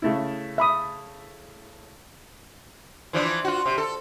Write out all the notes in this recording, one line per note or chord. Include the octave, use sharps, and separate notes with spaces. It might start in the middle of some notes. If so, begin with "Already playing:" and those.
C#3 A3 E4
E5 B5 D#6
E3 F3 D4
F4 F#4
C3
A4